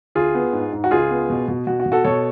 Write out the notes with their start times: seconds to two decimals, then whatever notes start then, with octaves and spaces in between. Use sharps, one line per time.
0.15 D2 F4 G#4
0.34 B3
0.53 G#2
0.73 G#2
0.84 F#4
0.91 C#2 F4 G#4
1.11 B3
1.30 B2
1.48 B2
1.67 B2 F#4
1.80 F#4
1.86 B2
1.92 F#4 A4
2.04 B2 A4 C#5